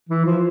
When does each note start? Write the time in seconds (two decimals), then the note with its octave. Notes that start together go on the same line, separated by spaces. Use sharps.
0.09 E3
0.25 F3